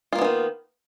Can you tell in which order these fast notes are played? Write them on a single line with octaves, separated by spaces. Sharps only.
F4 A#3 B3 E3 D#3